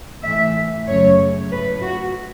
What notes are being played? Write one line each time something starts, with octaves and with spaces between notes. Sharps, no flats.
A2 E3 A3 E5
F#2 C#3 F#3 A3 C#5
A2 A3 B4
F#4